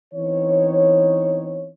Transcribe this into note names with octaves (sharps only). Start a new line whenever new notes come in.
E3 B3 C4 D#4 C#5